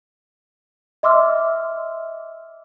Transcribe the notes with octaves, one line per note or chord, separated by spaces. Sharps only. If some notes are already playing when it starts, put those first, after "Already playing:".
D#5 E5 C6 D6 E6 F6